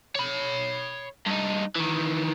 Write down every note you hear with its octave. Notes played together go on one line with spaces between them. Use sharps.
C#5 B5
G2 D#4
D#3 E3